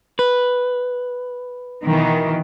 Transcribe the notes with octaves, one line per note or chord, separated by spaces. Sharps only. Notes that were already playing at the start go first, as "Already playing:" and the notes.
B4
B2 D#3 E3